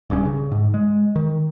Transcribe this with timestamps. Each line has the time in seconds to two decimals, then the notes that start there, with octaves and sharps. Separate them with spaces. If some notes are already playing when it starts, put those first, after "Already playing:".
0.10 D1 C2 G2 C#4
0.25 C#3
0.51 G#2
0.74 G#3
1.16 D#3